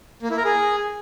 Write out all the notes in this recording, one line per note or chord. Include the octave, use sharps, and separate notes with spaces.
A#3
E4
A#4
G#4